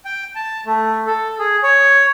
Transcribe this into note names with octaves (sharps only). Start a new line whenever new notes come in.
G5
A5
A3
A4
G#4
C#5